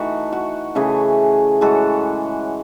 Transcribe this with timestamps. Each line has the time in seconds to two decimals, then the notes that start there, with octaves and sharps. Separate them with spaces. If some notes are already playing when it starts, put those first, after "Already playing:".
Already playing: E3 A3 D#4 F#4
0.33 F#4
0.75 C#3 E3 A3 G#4
1.61 A2 E3 G#3 F#4 A4